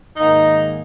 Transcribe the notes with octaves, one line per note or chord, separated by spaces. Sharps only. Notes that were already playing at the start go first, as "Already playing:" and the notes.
G#2 D#3 A#3 D#4